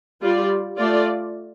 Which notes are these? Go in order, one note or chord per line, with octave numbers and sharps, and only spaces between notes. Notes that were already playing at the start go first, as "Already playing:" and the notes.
G3 F4 D5
A3 F4 D5